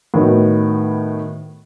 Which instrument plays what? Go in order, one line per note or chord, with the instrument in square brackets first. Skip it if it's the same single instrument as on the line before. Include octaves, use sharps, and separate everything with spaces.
[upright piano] A2 D#3 B3 F#4